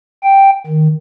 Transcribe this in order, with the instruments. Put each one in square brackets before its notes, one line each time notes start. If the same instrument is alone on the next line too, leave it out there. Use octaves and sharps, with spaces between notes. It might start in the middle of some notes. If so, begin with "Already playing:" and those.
[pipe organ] G5
D#3